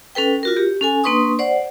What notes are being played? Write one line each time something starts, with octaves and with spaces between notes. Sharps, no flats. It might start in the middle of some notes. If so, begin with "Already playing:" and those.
C#4 A4 B4 G5
F4 F#4 A#4
G4
C#4 A4 G#5
A#3 D4 B4 C6 C#6 D#6
C5 D5 F#5